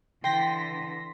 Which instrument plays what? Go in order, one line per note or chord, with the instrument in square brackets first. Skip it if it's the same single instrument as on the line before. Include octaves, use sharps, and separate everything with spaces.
[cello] D3 E3 [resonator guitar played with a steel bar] G5 [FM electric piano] C6 A#6 B6